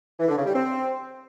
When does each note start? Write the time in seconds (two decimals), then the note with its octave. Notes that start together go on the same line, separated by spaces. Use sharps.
0.20 E3
0.28 D3
0.37 C#3
0.46 G3
0.55 C4